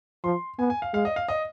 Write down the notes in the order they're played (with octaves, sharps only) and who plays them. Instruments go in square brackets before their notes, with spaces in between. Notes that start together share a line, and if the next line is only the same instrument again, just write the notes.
[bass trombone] F3 [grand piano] C6
[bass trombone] B3 [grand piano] G#5
[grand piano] G#5
F5
[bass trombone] G#3 [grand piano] F5
[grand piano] D#5
F5
D#5